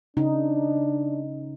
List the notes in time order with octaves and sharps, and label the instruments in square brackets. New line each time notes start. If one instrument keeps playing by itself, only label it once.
[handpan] C#3 D#4 [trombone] D4